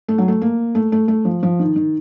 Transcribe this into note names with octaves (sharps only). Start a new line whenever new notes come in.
A3
F#3
A3
A#3
A3
A3
A3
F3
F3
D#3
D#3